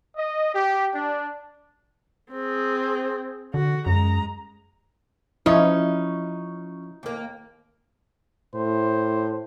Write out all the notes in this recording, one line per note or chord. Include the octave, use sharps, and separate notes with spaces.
D#5
G4
D4
C4 G#4
D3 F#4
F#2 G#3 A#5
F3 C#4 D#4 E4 C#5
D#2 A#3
A2 C5